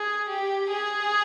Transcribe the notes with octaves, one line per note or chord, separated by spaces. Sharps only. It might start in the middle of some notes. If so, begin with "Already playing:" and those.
Already playing: G#4
G4
G#4